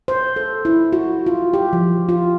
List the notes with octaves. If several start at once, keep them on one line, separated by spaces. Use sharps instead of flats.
C5
A4
E4
F#4
F4
G4
F3
F4